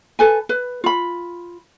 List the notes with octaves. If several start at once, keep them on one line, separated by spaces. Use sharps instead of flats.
A4 B4 G#5
B4
F4 B5